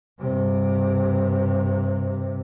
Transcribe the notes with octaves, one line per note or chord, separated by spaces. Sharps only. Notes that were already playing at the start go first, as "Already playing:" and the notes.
G2 C3